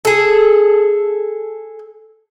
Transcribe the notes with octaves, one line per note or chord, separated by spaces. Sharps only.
G#4 A4